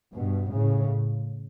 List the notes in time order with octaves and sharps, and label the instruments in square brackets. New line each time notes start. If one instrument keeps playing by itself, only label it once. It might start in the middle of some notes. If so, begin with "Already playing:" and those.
[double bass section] G2 B2
A2 C#3